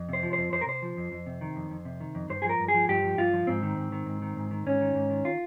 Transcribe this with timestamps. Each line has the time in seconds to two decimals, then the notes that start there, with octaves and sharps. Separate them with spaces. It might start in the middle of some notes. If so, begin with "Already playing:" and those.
Already playing: F2
0.09 C3 C5
0.23 F3
0.33 F2 C5
0.52 F2 C5
0.61 A#4
0.67 C3 C5
0.82 F3
0.97 F2
1.12 F2
1.26 C3
1.41 D#3
1.56 F2
1.70 F2
1.85 C3
2.01 D#3
2.15 F2
2.30 G2 C5
2.42 F3 G#4
2.49 A#4
2.60 G2
2.68 G#4
2.74 F3
2.89 G2 G4
3.04 F3
3.18 G2 F4
3.34 F3
3.47 G#2 C4
3.63 D#3
3.77 G#2
3.92 D#3
4.06 G#2
4.22 D#3
4.37 G#2
4.51 D#3
4.66 G#2 C#4
4.81 D#3
4.95 G#2
5.10 D#3
5.25 F4